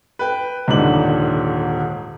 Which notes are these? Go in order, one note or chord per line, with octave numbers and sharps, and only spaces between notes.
B4 G5
D#1 G#2 D3 F#7